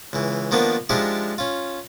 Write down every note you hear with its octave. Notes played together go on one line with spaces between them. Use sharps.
C#2 E3
D#3 F3 A#3 B3 D4 C5
F3 G#3 D4 D#4 G4 E5
C#4 F4